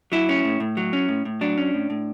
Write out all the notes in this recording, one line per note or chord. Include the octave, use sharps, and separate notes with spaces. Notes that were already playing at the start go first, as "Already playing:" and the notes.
F#3 E4
C#4
A2
A2
F#3
C#4
A2
A2
F#3 D4
C#4
A2
A2